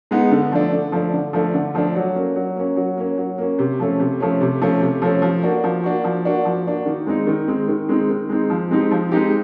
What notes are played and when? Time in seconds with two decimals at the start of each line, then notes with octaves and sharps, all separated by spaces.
0.11 G#3 B3 D#4
0.31 D3
0.52 F3 A3 D4
0.73 D3
0.92 F3 A3 D4
1.13 D3
1.33 F3 A3 D4
1.54 D3
1.75 F3 A3 D4
1.96 F#3
2.15 A#3 C#4
2.36 F#3
2.56 A#3 C#4
2.76 F#3
2.97 A#3 C#4
3.18 F#3
3.38 A#3 C#4
3.59 C3
3.80 F3 A3 C#4
4.00 C3
4.20 F3 A3 C#4
4.41 C3
4.62 F3 A3 C#4
4.81 C3
5.02 F3 A3 C#4
5.22 F3
5.43 A#3 D4 F#4
5.64 F3
5.84 A#3 D4 F#4
6.04 F3
6.25 A#3 D4 F#4
6.45 F3
6.66 A#3 D4 F#4
6.86 D#3
7.07 G#3 C4 D#4
7.27 D#3
7.48 G#3 C4 D#4
7.68 D#3
7.89 G#3 C4 D#4
8.09 D#3
8.29 G#3 C4 D#4
8.50 F3
8.71 G#3 C4 D#4 G4
8.91 F3
9.11 G#3 C4 D#4 G4